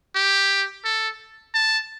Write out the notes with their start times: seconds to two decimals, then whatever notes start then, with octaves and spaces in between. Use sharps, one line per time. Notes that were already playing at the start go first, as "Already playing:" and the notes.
0.16 G4
0.85 A4
1.54 A5